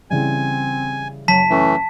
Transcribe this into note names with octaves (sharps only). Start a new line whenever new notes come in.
C#3 E3 G3 C4 G#5
F#1 F#3 A5 B6 D#7
E3 A3 C#4